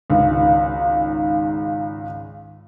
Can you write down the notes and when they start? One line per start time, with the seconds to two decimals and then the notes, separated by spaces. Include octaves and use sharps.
0.10 G#1 C#2 G#2